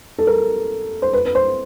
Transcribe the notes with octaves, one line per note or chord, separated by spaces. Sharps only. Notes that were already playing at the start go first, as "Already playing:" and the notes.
A4
A#4
C5
B4
B4
C5